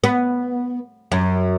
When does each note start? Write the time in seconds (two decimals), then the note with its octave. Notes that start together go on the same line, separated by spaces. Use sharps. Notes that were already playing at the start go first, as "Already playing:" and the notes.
0.04 B3
1.12 F#2